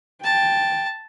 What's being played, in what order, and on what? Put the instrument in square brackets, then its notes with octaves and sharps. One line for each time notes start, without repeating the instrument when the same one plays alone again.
[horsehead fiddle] G5 [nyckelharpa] A5